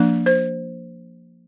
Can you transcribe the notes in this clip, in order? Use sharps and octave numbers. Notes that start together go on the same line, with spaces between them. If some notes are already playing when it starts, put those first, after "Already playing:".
Already playing: F3 A#3 D4
C5